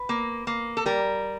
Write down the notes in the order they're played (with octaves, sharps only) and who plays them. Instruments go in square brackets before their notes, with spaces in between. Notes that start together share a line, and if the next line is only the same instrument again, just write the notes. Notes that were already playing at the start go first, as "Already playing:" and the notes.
Already playing: [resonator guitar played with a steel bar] B4
A#3
A#3
A4
G3 A#4